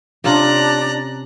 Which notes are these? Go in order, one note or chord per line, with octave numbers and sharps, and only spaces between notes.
C3 C#4 D4 F4 A#5 F#6